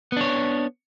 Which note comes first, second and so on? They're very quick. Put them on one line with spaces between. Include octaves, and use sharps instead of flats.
B3 D4 C#5